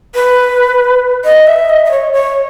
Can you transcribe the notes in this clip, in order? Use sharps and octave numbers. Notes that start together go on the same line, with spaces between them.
B4
D#5
E5
D#5
D#5
C#5
C#5